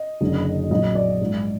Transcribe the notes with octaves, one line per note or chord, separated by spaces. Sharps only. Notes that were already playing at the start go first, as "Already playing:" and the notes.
Already playing: D#5
F#1 F#2 D3 F#3
A#1 A#2 F#3 B3 D#5
D5
G#2 F3 G#3